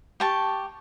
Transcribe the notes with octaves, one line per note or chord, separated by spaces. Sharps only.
G4 A5 C#6